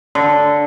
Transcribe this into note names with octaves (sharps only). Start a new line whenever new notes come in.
D3